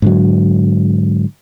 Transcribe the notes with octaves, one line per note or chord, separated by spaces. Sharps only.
G#2 D3 F#3